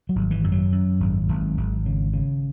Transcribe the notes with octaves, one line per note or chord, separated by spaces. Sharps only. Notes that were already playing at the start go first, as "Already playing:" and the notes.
F#3
G#1
E3
F#2
F#3
F#2
G#1
G#1
G#1
C#3
C#3